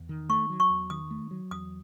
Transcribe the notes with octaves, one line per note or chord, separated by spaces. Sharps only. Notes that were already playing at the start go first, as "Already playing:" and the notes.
Already playing: E2
D#3
A3 C#6
F#3
C#6
E2
D#3 D#6
A3
F#3
E2 D#6